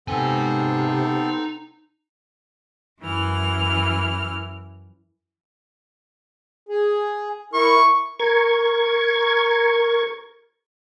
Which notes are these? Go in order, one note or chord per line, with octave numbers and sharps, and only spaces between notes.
C3 B3 C4 D#4 A4 G#5
F#2 E3 F6
G#4
E4 A#4 C#6
A#4 C#6 G#6